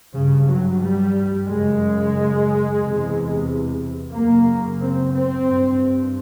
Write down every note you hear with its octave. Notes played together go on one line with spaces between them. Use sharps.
G2 C#3
F#3
G3
F#2 C#3 G#3
E2 C3
F#2 C#3 A#3
C4
C4
G2